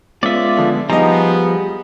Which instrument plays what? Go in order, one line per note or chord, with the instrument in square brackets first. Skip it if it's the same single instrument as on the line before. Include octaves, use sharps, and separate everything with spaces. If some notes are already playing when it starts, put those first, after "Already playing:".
[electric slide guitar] G#3 B3 C#4 [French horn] F4 [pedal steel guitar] D5 E5
[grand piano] D3 F3
[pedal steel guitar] F3 A#5 [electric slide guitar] G3 G#4 [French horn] B3 [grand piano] D#4 D#5